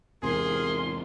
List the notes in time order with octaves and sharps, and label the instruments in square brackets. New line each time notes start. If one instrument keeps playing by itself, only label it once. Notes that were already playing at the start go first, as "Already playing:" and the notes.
[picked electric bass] E2 G#2 C3 [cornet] G#4 [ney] A#4 [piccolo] C6